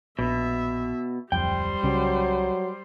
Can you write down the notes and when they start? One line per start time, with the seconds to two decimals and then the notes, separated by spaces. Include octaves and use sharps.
0.19 A#1 B2 E5
1.32 D1 F2 G3 C5 G5
1.83 C2 C#3 F#3 C#4